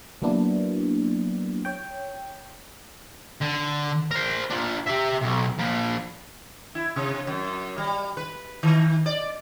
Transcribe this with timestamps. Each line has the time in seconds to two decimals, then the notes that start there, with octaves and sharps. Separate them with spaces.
0.22 F#3 A#3 B3 D4 E4
1.65 C#5 G5
3.41 D3
4.11 A#4 C5
4.50 D4 F4
4.86 G4 E5
5.21 B1
5.59 F3 A#3
6.75 E4
6.96 C3
7.27 F#2
7.78 G3
8.17 B4
8.63 D#3
9.06 D5